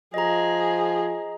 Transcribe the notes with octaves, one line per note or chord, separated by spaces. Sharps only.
F3 G#4 D#5 A#5